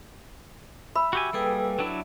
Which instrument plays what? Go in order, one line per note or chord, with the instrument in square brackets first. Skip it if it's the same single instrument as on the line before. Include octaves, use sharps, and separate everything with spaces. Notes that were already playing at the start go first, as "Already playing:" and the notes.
[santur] E5 [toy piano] B5
[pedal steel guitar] F#4 G4 G#5
[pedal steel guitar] G3 A#3 G#4 [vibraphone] A4 B4 G5
[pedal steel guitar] F#3 D4 E4